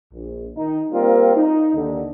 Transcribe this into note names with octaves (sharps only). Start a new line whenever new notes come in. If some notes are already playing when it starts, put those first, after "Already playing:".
A#1
D#3 D#4
G3 A#3 C4 F4 A#4
D#4
D#2 D3